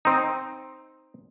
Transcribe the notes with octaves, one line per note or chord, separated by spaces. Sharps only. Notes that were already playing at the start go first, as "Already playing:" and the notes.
C4 D#4